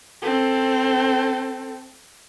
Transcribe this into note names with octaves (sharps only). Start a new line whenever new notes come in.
C4 A4